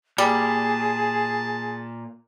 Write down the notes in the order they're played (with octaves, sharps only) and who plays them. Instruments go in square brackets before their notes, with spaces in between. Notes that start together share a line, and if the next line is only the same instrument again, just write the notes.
[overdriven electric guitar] A#2 [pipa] G3 [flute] G#4 [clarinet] A5